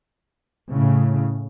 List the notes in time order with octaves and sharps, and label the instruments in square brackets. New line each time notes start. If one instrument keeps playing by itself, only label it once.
[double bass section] A2 C#3